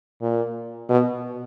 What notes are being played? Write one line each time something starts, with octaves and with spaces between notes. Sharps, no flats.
A#2
B2